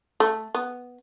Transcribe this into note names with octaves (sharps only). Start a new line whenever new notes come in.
A3
B3